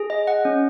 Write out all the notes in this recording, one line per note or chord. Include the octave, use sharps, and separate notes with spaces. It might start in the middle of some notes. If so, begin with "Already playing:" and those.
Already playing: G#4
D#5
F#5
C#4